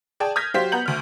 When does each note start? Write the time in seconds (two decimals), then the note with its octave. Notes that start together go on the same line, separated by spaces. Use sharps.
0.20 G#4 D5 G5 A5
0.36 D#6 F6 G6 G#6 A#6 B6
0.54 F#3 G4 C5 F5 B6
0.72 B3 F#5 A#5 G6 F#7
0.86 D2 F6